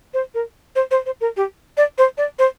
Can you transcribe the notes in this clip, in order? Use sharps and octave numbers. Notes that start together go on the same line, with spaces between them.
C5
A#4
C5
C5
C5
A#4
G4
D5
C5
D5
C5